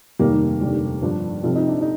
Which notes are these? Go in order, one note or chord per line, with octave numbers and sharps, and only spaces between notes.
F1 D#2 D#3 G3 A#3
F1 D#2 D3 G3
G1 G2 F3 D4
F1 F2 C3 F3 F4
D#4
D4
D#4